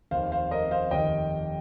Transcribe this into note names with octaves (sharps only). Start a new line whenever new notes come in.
F1 D#2 D#3 C5 F5
C5 F5
A#4 D#5
C5 F5
F1 D#2 D#3 D#5 G5